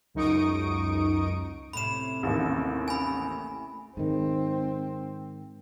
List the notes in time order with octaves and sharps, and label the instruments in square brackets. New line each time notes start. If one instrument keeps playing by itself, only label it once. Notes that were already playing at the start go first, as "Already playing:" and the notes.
[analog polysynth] C#2 F#2 D#4 C#6 D#6 D7
[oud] A2 C3 C#4 [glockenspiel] B5 E7
[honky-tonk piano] A1 D#2
[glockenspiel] G#5 B5
[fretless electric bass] G#2 D#3 [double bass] C4